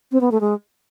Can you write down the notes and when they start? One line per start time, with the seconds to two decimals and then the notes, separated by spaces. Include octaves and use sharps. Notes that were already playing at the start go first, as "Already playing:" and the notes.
0.12 C4
0.21 B3
0.32 A3
0.41 G#3